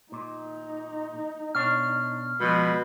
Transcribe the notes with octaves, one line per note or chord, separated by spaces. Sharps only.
A#2 D#4
B2 D4 C#5 F6
B2 F3 G#3 B5